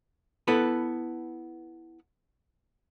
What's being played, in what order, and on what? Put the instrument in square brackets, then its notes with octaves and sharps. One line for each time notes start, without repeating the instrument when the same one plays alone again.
[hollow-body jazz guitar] B3 E4 A4 B4